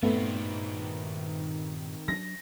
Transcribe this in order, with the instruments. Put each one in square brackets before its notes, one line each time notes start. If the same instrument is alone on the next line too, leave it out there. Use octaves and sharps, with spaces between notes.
[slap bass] G2 A#2 [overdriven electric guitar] D#3 C4 [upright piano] A3 B3
[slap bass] F#3 D4 [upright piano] A#6